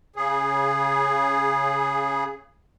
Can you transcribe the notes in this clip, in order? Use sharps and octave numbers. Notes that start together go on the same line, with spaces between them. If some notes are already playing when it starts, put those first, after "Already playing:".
C#3 G#4